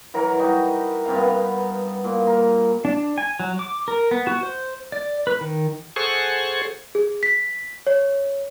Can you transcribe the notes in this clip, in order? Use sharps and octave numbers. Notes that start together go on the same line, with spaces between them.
E3 F#3 A#4
G3 D#4 F#4
G2 C3 F5
B3
A#2
A#4
D4
G#5
F#3
D6
A#4
B3
F#4
C5
D5
B4
D#3
G#4 A4 C5 F#5 G#5 C#6
G#4
B6
C#5